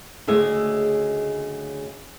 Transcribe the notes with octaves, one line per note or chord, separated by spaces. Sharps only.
D2 C#3 G#3 E5